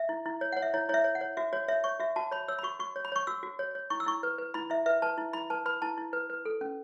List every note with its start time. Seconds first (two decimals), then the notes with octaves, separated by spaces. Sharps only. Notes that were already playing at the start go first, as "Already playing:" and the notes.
Already playing: E5
0.09 E4
0.26 E4
0.41 C#5
0.52 C#5 F#5
0.62 E5
0.74 E4 C#5
0.89 E4 C#5
0.94 E5
1.04 C#5
1.15 F#5
1.21 C#5
1.37 F#4 E5
1.53 F#4 C#5
1.68 C#5 E5
1.84 C#5 C#6
2.00 F#4 E5
2.16 F#4 A5
2.31 C#5 B5
2.48 C#5 E6
2.59 B5
2.63 F#4 C#6
2.80 F#4 C#6
2.96 C#5
3.05 B5
3.12 C#5 C#6
3.27 F#4 E6
3.43 F#4
3.59 C#5
3.75 C#5
3.90 E4 C#6
4.00 E6
4.06 E4 C#6
4.23 B4
4.38 B4
4.54 E4 B5
4.70 E4 E5
4.86 B4 E5
5.02 B4 A5
5.18 E4
5.33 E4 B5
5.50 B4 A5
5.66 B4 B5
5.82 E4 A5
5.98 E4
6.13 B4
6.30 B4
6.45 A4
6.61 C#4